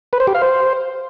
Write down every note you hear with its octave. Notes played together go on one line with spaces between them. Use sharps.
B4
C5
G4
F5
C5